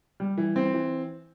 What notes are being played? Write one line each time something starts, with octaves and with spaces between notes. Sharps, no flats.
G3
E3
C4
E3